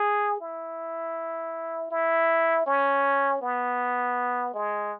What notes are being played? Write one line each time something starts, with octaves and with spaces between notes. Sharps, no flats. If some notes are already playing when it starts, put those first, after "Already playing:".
Already playing: G#4
E4
E4
C#4
B3
G#3